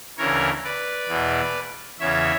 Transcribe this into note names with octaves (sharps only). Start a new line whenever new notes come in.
D2 C#3 E3 A#4 C#5
B4 D5
E2 B2
E2 C#3 E3 C#5 E5